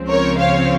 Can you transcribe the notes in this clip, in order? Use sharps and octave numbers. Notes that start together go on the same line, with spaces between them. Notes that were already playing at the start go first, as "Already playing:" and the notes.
Already playing: C#2 C#3 F3 C4
A#4 C#5
C#5 F5